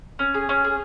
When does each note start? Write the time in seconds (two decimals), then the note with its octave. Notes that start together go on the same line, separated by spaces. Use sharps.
0.19 C#4
0.34 G#4
0.49 C#4
0.64 G#4